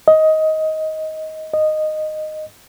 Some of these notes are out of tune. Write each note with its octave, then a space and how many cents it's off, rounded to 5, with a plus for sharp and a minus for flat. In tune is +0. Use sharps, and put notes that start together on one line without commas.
D#5 +15
D#5 -10